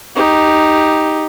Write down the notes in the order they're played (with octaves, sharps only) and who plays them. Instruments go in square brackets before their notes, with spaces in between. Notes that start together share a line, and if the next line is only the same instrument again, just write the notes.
[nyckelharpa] D#4 G4